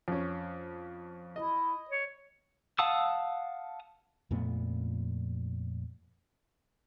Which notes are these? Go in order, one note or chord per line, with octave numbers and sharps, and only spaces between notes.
F2 C#4
E4 D#5
C#5
F5 F#5 A5 D#6 E6
F2 A#2 A3 B3